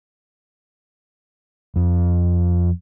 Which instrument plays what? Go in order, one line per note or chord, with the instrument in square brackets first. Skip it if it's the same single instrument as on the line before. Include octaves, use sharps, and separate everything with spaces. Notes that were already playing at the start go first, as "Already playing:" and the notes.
[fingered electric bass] F2